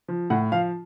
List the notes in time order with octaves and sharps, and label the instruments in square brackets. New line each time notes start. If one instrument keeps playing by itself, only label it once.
[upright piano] F3
A2 F#5
F3 F5